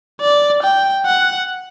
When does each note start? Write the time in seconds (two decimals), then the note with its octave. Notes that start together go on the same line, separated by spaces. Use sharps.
0.21 D5
0.63 G5
1.06 F#5